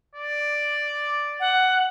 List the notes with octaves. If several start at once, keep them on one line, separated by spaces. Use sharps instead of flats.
D5
F#5